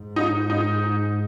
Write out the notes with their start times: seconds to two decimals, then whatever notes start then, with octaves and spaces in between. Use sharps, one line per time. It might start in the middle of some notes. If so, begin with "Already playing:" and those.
Already playing: G#2
0.16 D#4
0.50 D#4